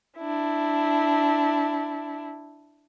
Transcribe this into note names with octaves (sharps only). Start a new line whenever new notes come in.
D4 E4